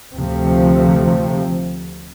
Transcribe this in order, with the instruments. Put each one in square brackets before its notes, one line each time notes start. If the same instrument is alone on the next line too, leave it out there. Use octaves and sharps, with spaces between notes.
[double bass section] D2 C3 F3 A3